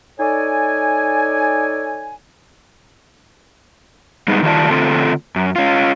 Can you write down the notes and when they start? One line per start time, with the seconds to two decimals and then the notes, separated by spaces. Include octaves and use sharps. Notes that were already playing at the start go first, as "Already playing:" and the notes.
0.20 D#4 A4 C#5 D5 G#5
4.28 G3 G#3 B3 D#4
4.43 D#3 G3 A3 F4 D5 A5
4.71 D3 A3 C4 F4 A4
5.36 F#2
5.56 C#4 F4